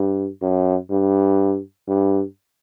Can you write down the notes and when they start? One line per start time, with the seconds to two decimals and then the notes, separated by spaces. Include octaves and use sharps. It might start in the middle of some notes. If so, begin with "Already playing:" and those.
Already playing: G2
0.42 F#2
0.90 G2
1.88 G2